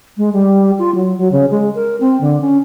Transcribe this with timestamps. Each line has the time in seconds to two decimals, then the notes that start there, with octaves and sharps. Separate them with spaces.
0.17 G#3
0.33 G3
0.79 F4
0.95 F#3
1.18 F#3
1.32 C#3
1.51 G#3
1.75 A#4
2.00 C4
2.21 D3
2.41 C#4